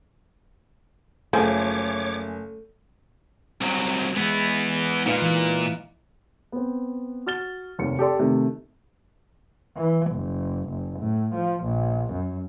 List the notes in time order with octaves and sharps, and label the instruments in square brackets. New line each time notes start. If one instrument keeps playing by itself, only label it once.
[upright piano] F#1 G#5 G6 [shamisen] F3 G#3 [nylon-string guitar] A3 [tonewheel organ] C#5 D6
[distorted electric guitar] C2 F#3
[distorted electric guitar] E3 B3 [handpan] G#3
[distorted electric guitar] A#2 [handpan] D#4 B4 F5
[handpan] E3
[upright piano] B3 C4
F#4 F6 A6 G7
F1 D#2 C#7
G4 A4 D5 C6
C3 D#3 A3
[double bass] E3
F#1
F#1
A2
F3
A#1
F#2